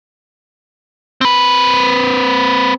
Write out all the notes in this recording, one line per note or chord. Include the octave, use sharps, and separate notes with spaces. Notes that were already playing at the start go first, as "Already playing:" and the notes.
C4 B4